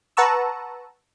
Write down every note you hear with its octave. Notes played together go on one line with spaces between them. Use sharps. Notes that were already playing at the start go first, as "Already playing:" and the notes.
B4 F#5 A5 A#5 C#6 E6